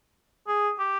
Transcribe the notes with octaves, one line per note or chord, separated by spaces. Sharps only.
G#4
G4